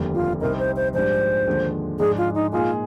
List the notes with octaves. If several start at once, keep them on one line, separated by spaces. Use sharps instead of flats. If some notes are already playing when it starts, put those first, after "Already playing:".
Already playing: F1 D#2 D3 G3 D4
F4
C2 C3 G3 C4 D#4 A#4
C5
C5
A#1 G#2 G3 D4 C5
D#2 D3 F3 G#3 D4
G#2 F3 G#3 D4 G#4
F4
D#4
A#2 G#3 D#4 F4 G#4